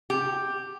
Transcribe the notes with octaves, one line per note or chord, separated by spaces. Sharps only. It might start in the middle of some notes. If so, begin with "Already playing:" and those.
G4